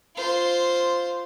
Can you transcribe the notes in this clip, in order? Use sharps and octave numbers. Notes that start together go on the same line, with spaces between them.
F4 C5